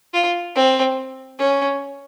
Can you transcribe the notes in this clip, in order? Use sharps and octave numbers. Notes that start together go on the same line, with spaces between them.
F4
C4
C#4